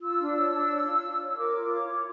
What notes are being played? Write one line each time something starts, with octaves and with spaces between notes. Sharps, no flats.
F4 E6
D4
C#5
D4
C#5
F4
F4
C#5
A#4 D6
F4
C#5
F4